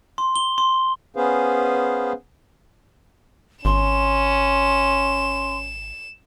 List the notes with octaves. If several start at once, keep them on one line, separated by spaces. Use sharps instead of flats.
C6
G7
C6
B3 C#4 G#4 B4 C5 F5
G#1 C#4 C6 E7